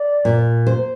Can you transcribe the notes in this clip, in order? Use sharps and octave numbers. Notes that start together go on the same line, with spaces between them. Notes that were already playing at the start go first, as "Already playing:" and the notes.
Already playing: D5
A#2
C5